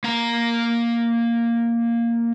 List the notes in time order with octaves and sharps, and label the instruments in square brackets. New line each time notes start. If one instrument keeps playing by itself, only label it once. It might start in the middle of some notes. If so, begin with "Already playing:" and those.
[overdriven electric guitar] A#3 A#5